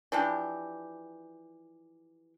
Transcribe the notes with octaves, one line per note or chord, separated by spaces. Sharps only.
E3 F3 D4 G4